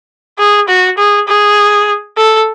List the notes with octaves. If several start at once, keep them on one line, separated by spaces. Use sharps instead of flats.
G#4
F#4
G#4
G#4
A4